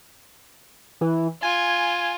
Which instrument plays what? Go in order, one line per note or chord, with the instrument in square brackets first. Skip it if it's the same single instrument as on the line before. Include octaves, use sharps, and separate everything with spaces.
[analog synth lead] E3
[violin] F4 [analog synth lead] G#5